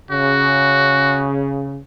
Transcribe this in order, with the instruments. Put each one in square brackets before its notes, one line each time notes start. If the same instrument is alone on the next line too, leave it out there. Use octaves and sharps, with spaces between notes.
[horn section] C#3 [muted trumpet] F#4